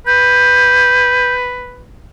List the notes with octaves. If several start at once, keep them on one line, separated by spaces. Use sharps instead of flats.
B4 G6